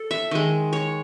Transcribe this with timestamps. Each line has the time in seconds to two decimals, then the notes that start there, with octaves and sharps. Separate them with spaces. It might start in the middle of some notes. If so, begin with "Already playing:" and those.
Already playing: A4
0.11 E5
0.31 D#3 G#3
0.73 C#5